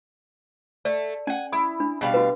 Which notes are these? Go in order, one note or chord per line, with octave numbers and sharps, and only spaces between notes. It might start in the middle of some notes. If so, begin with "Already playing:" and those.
A3 D5
C#4 F#5 G#5
E4 D#6
D4
B2 G3 F5
F#4 B4